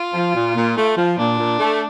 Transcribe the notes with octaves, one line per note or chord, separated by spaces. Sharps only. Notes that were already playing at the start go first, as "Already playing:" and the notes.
Already playing: F4
F3
A#2
A#2
A3
F3
A#2 D4
A#2
A3